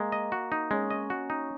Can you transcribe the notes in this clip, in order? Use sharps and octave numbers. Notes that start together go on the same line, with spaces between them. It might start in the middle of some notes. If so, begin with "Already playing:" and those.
Already playing: G#3 A#3
D#5
F#4
D#4
G#3 C#4
D#5
F#4
D#4